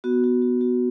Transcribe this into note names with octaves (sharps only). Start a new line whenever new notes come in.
B3 F#4
F#4
F#4
F#4